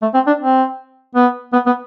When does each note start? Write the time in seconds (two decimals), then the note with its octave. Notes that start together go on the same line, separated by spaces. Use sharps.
0.02 A3
0.14 C4
0.27 D4
0.40 C4
1.15 B3
1.53 B3
1.67 B3